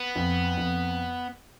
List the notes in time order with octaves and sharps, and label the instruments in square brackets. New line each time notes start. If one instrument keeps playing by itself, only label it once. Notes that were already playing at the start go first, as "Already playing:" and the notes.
Already playing: [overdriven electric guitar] B3
[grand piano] F2
F2